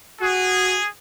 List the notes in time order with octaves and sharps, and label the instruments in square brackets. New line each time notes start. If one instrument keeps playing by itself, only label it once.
[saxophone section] F#4 [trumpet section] G#4